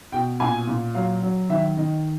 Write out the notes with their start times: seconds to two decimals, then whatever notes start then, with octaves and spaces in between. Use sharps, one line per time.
0.12 B2 G5
0.40 A#2 G#5
0.67 A#2
0.95 F#3 F5
1.22 F#3
1.49 D#3 E5
1.77 D#3 D#5